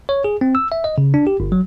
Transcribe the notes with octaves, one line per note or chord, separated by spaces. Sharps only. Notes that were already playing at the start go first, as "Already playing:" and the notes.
C#5
G#4
C4
E6
E5
D#5
C#3
D4
G4
G1
F#3